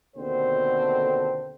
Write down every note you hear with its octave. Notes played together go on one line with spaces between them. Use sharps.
D#2 B2 D3 C4 A4 C5